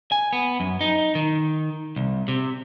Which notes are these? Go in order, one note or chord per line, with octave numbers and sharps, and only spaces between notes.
G#5
B3
F#2
D#4
D#3
C2
C3